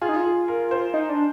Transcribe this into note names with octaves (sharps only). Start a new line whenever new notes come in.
F4 G#4
D#4
F4
G#4
A#4
C5
D#4
D4